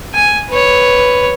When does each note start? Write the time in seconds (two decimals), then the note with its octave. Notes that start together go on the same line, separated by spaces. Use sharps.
0.14 G#5
0.49 B4 C#5